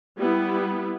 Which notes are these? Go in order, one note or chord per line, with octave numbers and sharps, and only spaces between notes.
G3 B3 E4